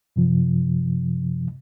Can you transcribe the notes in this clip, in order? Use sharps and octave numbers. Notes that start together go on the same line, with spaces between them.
F#2 C3 F3